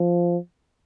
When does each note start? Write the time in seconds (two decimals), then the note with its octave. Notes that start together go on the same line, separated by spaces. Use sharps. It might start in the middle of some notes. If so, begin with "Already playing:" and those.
Already playing: F3